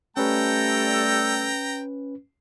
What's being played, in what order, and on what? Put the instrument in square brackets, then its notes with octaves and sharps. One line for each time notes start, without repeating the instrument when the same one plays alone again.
[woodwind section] G3 A3 A4 [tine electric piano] C#4 B4 [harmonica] G5 A#5